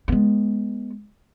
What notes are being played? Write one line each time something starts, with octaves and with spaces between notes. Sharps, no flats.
G#3 B3